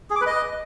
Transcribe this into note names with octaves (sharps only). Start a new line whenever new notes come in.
G#4
D6
B4
D#5